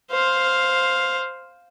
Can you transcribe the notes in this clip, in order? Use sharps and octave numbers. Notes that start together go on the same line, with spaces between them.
C5 F5